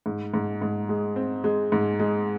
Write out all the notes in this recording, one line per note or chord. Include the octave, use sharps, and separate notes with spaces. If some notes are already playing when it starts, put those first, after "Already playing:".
G#2
G#2
G#2
G#3
C4
G#3
G#2
G#3